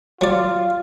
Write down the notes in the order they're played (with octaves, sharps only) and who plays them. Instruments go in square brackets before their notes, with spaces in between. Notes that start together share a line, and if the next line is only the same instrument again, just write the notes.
[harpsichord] F#3 D5 [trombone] F4